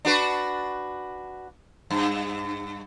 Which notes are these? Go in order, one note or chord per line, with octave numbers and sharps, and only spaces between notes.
D4 F#4 B4
G2